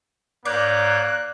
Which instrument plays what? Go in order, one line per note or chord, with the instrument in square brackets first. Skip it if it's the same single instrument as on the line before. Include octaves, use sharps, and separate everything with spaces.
[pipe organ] G#2 C#5 G6 [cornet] A#3 [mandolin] D5 [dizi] F#6